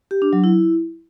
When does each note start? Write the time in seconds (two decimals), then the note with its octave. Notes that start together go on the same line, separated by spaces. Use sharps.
0.11 G4
0.22 D4
0.33 F#3
0.44 E4